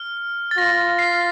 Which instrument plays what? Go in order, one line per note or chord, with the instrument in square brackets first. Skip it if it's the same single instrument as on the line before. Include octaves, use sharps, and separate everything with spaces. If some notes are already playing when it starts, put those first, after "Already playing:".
Already playing: [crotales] F6
A6
[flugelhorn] F4 [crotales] A#6
[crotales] C7